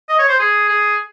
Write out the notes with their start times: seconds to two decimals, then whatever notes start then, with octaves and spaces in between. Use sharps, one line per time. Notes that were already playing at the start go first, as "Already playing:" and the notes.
0.09 D#5
0.19 C#5
0.28 C5
0.39 G#4
0.69 G#4